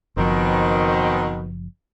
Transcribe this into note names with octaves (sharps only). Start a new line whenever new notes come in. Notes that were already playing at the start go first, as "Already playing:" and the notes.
F#1 B2 D#3 F3 C4